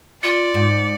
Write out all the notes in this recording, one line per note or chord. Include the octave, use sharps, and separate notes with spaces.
F4 D5 C#7
G#2